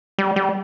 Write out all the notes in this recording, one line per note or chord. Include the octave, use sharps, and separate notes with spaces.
G3
G3